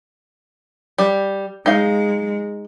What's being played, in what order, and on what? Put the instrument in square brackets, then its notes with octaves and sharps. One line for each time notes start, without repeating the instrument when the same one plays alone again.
[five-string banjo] G3
[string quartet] G#3 [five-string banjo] D#4 F5